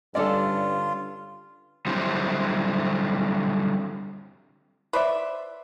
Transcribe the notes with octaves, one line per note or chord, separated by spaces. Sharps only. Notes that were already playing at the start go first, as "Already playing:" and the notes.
G2 D3 G3 C#4 F4 A4 D5
D3 F#3 G3 C4 E4 C5
B4 C5 D5 E5